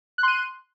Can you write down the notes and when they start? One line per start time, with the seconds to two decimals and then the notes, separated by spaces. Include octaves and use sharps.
0.18 F#6
0.23 C6
0.28 D#7